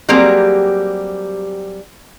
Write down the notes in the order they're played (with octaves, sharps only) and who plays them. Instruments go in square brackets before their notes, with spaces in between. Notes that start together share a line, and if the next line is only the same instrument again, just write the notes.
[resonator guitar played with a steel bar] F#3 G3 A#3 C4 G4 G#4